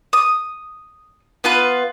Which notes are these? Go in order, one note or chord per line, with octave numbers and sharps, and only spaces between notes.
D#6
B3 F4 B4